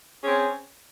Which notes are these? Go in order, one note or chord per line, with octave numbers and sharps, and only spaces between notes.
C4 C#4 G#4